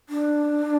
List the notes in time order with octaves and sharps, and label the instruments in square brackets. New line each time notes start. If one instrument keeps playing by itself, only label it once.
[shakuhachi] D4